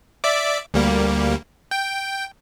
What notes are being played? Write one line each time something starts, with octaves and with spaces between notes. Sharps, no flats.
D5 E5 D6
D2 G3 A#3
G5